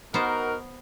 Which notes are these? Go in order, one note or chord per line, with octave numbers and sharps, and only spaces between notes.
B3 D#4 F#4 A#4 C5